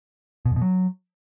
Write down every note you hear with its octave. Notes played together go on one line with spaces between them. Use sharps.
B2
F2
B2
F#3